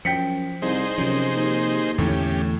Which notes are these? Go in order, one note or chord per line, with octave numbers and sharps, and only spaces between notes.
F#2 F3 G5 B6 C#7
C2 D#4 G#4 C5
F#2 C3 F3
D#2
E2 A2 D3 A3 C#4 G4